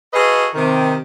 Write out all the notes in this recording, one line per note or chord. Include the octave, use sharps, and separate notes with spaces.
F#4 G#4 A4 B4 D#5 F5
C3 D#3